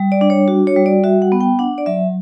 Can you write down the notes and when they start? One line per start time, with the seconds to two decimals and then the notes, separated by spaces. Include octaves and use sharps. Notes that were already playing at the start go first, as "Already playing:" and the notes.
Already playing: G3
0.12 D5
0.21 D4
0.30 C#5
0.48 F#4
0.67 C#5
0.76 G3
0.86 D5
1.04 F#4 E5
1.22 F#5
1.32 B3
1.41 G5
1.59 D4 F#5
1.78 D5
1.86 F#3 E5